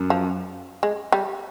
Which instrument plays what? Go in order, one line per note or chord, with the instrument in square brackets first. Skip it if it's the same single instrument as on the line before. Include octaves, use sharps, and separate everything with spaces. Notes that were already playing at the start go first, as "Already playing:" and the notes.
Already playing: [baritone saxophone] F#2
[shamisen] F3
G#3
G3